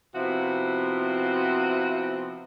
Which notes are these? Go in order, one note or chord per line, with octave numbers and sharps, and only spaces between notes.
C3 F3 B3 E4 F#4